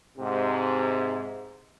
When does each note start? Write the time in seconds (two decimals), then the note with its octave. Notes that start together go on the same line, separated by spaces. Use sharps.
0.18 G#2 C3